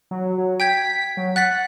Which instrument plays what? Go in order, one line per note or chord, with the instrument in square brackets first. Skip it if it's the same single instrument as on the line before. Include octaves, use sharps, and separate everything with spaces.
[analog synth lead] F#3
F#3
[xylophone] G5 G6 G#6 [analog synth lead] B6
[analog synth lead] F#3
[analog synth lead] F#5 [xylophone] F#6 A6 B6